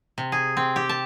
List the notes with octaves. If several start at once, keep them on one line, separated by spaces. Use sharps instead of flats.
C3
G#4
C4
G4
A5